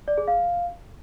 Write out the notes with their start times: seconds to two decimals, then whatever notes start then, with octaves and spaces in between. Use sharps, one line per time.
0.08 D5
0.18 G#4
0.28 F5